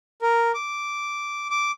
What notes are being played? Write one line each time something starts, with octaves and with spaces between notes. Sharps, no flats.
A#4
D6
D6